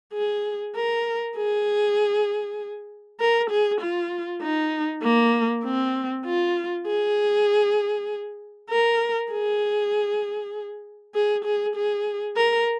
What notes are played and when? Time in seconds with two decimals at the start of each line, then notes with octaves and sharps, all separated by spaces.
0.14 G#4
0.76 A#4
1.37 G#4
3.20 A#4
3.50 G#4
3.81 F4
4.42 D#4
5.03 A#3
5.65 C4
6.25 F4
6.87 G#4
8.70 A#4
9.32 G#4
11.15 G#4
11.45 G#4
11.76 G#4
12.36 A#4